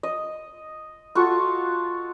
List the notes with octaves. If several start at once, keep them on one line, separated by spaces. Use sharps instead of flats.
D#5
F4 F#4 A4 C#6